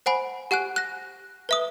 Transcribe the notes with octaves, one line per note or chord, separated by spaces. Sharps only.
C5 F#5 G#5 B5
G4 F#5 G#5 F#6
F#6 A#6
B4 E5 D#6